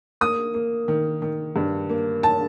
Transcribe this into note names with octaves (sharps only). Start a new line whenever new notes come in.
A#3 D#6
A#3
D#3
D#3
G2
A#3
A5